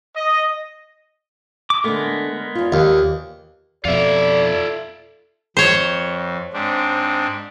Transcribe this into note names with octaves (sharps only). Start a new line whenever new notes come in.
D#5
D6
D3 G#3 A3 B3 A#4
E2 F4
D#2
F2 B2 F4 A4 D5 E5
F2 C5 C#5
G#2 C4 D4